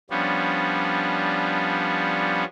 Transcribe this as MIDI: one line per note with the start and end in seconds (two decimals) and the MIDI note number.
0.10 2.44 53
0.10 2.44 55
0.10 2.44 59
0.10 2.44 61
0.10 2.44 62